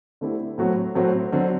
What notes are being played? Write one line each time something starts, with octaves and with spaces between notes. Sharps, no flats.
D3 A3 C4 E4 G4
A2 F#3 A3 C4 F#4
A2 F#3 A3 C4 F#4
D3 F#3 C4